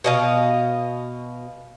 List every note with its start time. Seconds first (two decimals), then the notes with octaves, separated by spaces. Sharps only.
0.04 B2 D#5 F5